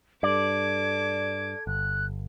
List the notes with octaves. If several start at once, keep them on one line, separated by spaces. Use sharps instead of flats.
G2 A4 D5 D6 G#6
G1 F#6